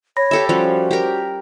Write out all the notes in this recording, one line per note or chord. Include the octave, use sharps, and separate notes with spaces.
C#5 B5 A#6
G4 A4 E5 B5
F3 G3 C#4 F#4 C5
G4 A#4